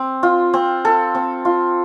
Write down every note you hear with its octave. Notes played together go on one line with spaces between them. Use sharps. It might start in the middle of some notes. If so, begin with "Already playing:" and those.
Already playing: C4
F4
C4
A4
C4
F4